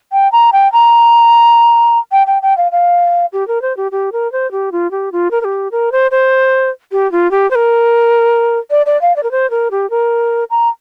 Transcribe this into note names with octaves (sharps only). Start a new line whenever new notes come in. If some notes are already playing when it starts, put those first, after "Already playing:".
G5
A#5
G5
A#5
G5
G5
G5
F5
F5
G4
A#4
C5
G4
G4
A#4
C5
G4
F4
G4
F4
A#4
A#4
G4
A#4
C5
C5
G4
F4
G4
C5
A#4
D5
D5
F5
D5
A#4
C5
A#4
G4
A#4
A#5